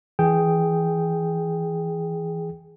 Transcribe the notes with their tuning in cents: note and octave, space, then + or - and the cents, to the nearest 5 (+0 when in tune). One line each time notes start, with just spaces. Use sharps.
E3 +0 G#4 +0 G5 +0